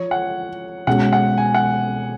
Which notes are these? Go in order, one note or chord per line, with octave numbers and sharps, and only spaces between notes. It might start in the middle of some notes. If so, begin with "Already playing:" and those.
Already playing: F3 C#5
F#5
B2 G#3 C#4 F#4 F#5
F#5
G#5
F#5